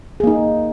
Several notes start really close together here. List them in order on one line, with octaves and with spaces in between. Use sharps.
G#4 A#3 D#4